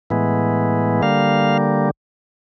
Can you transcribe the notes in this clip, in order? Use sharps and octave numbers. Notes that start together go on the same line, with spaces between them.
A2 E3 G#3 B3
D3 G3 A#3 F5